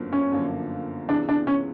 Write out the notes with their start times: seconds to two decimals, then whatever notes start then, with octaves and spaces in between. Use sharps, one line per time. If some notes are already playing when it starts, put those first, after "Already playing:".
Already playing: G1 F#2 D3 F3 A#3
0.12 C#4
0.32 G1 F#2 D3 F3 A#3
1.08 C#2 C3 E3 G#3 B3 D4
1.29 D4
1.47 C#4